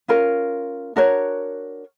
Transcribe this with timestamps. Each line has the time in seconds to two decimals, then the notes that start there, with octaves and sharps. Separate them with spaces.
0.08 C#4 F4 A#4
0.96 D4 F#4 A#4 C#5